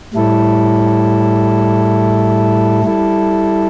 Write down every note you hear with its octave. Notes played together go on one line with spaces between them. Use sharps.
A2 G3 E4 A4
G3 E4 A4